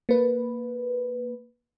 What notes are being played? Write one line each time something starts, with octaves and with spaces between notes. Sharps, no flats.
A#3 B4